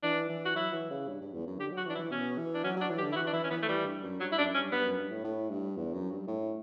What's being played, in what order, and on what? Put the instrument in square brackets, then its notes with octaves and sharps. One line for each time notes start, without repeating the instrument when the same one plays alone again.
[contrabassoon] E3 [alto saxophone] D4
[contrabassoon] E3
[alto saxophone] F#4
[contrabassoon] F#3 [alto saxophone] E4
[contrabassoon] E3
C#3
G2
G2
E2
F#2
[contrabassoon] D3 [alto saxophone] G4
[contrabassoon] F#3 [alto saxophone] F#4
[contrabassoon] E3 [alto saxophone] D4
[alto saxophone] E4
[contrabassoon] E3
[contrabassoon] B2 [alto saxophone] C#4
[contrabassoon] E3
[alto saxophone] D4
[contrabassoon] F#3 [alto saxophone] C#4
[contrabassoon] F#3 [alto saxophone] D4
[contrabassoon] E3
[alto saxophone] G4
[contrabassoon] D3
[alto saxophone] E4
[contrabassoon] E3 [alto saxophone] F#4
[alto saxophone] D4
[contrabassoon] E3 [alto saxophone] E4
[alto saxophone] C#4
[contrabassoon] E3 [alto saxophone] B3
[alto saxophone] A3
[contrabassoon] E3 [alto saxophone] G3
[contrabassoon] G2
F#2
[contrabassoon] G2 [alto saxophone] F#3
[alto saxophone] E4
[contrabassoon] F#2 [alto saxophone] D4
[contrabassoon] G2 [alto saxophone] C#4
[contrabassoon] G2 [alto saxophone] B3
[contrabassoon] F#2
G2
A2
A2
G2
E2
F#2
G2
A2